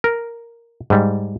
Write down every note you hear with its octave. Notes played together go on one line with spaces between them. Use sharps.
A#4
G#2 G3